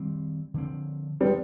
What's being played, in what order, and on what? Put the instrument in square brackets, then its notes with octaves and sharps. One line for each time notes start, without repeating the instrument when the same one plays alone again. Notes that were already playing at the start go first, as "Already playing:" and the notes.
Already playing: [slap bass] D#3 G3 C4
D3 F3 C4
[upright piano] G3 B3 [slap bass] C4
[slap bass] F3